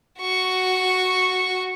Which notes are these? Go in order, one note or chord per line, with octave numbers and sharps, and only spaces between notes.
F#4 C#6